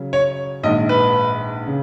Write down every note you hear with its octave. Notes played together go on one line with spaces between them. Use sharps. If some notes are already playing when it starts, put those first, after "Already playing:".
Already playing: C#3 F#3 C#4
C#5
A#1 G#2 D#3 D#5
B4
C#3